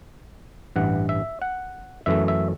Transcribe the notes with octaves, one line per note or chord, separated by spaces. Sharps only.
A1 G2 E3 F#5
E5
F#5
F#2 E3 A3 E5
E5